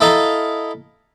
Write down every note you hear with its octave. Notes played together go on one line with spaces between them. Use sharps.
E4 A4 D#5 F5 A#5